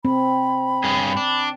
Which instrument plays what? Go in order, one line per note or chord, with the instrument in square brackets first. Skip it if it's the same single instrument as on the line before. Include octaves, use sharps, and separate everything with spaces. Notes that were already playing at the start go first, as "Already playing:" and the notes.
[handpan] C4 [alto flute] B5
[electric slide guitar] G2 C#4 G#4
D4